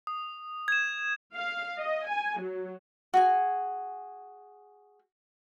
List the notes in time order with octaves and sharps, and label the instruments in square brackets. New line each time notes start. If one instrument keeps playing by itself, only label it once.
[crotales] D#6
G#6 E7
[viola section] F5
D#5
G#5
F#3
[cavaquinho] F#4 G#4 G#5